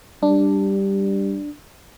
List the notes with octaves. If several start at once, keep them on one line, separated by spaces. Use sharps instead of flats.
G3 D4